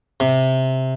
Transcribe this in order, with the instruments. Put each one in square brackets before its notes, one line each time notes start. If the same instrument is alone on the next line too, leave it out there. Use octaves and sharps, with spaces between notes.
[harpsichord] C3